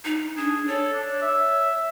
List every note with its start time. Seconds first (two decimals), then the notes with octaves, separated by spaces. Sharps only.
0.05 D#4
0.37 D4 G#4
0.68 A4 C#5
0.93 D4
1.22 E5